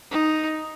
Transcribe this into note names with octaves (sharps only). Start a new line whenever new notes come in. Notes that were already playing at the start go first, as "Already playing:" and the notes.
D#4